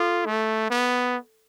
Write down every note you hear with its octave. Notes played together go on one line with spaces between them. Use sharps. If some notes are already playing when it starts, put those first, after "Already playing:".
Already playing: F4 A4
A3
B3